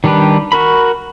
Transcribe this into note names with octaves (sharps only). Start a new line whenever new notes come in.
D#3 G3 D4 G4 B4
F#4 A#4 B5